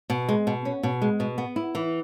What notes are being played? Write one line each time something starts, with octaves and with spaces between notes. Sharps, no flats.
B2
G#3
B2
C#4
B2
G#3
B2
B3
E4
E3